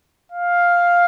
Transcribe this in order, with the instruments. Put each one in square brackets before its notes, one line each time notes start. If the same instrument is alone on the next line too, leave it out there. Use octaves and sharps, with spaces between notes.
[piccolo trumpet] F5